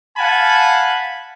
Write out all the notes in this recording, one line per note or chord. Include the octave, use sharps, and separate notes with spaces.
F5 F#5 G#5 A5 B5